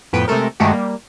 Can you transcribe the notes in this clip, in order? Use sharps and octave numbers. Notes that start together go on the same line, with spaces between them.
F2 A2 B3 B4 G5
C3 G#3 A3 A4 A#4
G2 D#3 G#3 A3 F#4 G4
G3 A#3